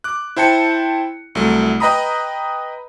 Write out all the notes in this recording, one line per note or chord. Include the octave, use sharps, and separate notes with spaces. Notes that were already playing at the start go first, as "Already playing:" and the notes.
D6 F#6
E4 C5 G5 A5 C#7
C2 F#3 A3
B4 D#5 G5 A#5 B5 D#6